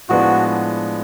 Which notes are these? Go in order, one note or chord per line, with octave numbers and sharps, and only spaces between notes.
A2 F3 G#3 B3 D4 F#4